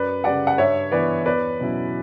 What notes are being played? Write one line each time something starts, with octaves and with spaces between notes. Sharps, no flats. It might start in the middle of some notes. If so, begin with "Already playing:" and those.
Already playing: F#2 B4 D5
C#3 G3 D5 F#5
F#5
G2 C#5 E5
E3 B3 E4 B4 D5
E2 B4 D5
B2 F#3 C#4 E4